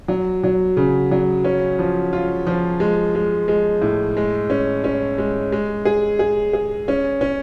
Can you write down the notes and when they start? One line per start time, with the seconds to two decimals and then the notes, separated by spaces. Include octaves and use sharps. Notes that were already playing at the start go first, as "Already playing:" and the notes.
0.08 F#3
0.44 F#3
0.77 C#3
1.11 F#3
1.44 C#4
1.79 F3
2.13 F4
2.47 F3
2.80 G#3
3.15 G#3
3.48 G#3
3.82 A2
4.17 G#3
4.50 C#4
4.84 C#4
5.18 G#3
5.52 G#3
5.85 G#4
6.19 G#4
6.53 G#4
6.88 C#4
7.21 C#4